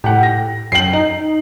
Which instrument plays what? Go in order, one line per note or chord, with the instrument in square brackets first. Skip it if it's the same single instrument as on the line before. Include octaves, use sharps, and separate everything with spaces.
[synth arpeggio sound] A2 [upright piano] G4 F#5
[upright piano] A#6
[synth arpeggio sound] F#2 G5 [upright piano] C7 F#7
[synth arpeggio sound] D#4